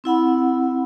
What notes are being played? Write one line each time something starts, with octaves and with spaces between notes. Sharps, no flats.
C4 E4 F#5 B5